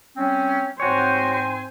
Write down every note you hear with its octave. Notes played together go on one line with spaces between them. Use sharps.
G3 C4 C#4
G#2 C4 F#4 C5 C#5 G5 G#5